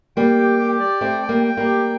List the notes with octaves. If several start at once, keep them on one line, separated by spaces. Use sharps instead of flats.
G3 A#3 G5
G4
G4
D5
A3 C4 G5
G5
G3 A#3
G5
G3 A#3
G4